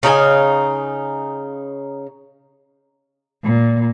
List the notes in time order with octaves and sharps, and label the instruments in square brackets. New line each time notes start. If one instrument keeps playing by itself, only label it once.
[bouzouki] C#3 D#4 G4 G#5
[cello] A#2